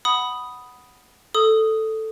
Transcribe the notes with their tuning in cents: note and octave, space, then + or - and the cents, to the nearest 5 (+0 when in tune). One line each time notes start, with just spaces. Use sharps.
F#5 +0 B5 +0 D#6 +0
A4 +0 D#6 +0